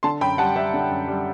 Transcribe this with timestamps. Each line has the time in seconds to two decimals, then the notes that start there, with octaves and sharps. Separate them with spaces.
0.03 D3 A5 C6
0.21 F#2 G5 B5
0.38 G3 F#5 A5
0.56 G3 E5 G5
0.74 D3
0.90 F#2
1.08 G3